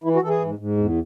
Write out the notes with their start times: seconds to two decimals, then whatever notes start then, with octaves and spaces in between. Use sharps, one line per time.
0.04 E3 E4
0.15 F#4
0.22 E3 A4
0.28 G#4
0.40 G#2
0.59 G#2
0.77 E2